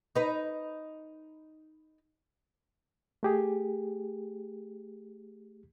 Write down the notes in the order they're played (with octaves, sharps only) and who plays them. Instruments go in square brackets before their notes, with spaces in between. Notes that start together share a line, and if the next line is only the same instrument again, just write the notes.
[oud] D#4 B4
[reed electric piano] A3 G4 G#4